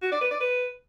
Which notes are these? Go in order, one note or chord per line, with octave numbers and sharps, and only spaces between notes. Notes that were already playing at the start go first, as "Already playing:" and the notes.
F#4
D5
B4
D5
B4